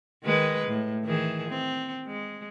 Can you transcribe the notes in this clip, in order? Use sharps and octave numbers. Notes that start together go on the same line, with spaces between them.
D#3 G#3 B4
A2
D#3 E3 G#4
C4
G#3